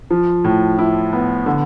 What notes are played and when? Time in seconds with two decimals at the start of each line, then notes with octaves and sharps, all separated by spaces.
0.10 F3
0.44 A2
0.79 E4
1.13 B3
1.46 D3